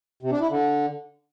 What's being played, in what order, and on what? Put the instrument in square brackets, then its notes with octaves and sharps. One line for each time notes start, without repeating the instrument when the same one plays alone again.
[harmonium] C3
D4
E4
D3